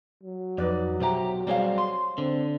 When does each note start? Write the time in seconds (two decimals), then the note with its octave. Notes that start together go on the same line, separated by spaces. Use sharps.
0.24 F#3
0.58 F2 D#4 B4 D5
1.00 B1 G4 C5 E5 A#5
1.47 G3 C4 G#4 C5 C#5 F5
1.78 C6
2.18 D3 C4